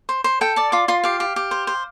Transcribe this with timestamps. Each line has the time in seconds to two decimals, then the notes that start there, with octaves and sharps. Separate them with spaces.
0.09 C5
0.24 C5
0.41 A4 G5
0.56 D5 A5
0.72 F4 D6
0.88 F4 C6
1.04 G4 F5
1.20 G4
1.36 G4
1.51 C5
1.67 C5